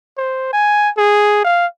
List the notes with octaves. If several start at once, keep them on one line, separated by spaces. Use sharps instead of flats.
C5
G#5
G#4
F5